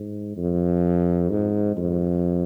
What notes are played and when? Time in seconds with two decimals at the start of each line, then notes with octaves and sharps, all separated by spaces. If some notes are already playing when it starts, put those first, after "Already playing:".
Already playing: G#2
0.37 F2
1.30 G#2
1.77 F2